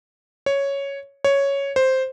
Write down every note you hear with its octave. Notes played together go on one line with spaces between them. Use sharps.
C#5
C#5
C5